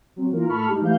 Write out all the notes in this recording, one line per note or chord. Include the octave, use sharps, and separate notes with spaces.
F#3 C4
E3 A#3 F4 A#4
A2 A4 A5 B5 C#6 F6
G#3 D#4 G4
E3 A3 F5 G6